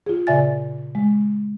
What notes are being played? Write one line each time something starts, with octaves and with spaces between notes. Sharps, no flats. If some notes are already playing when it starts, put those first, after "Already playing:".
F4 G#4
A#2 C#3 D5 E5 G#5 A6
G#3